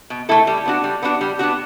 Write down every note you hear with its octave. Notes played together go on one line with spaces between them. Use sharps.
B2
A3 E4 A4
G3
B3 D4 F#4
G3
B3 D4 F#4
G3
B3 D4 F#4